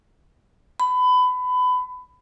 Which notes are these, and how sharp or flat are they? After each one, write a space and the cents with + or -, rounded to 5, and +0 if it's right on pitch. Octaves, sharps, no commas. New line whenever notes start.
B5 +25